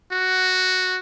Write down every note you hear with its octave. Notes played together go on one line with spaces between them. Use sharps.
F#4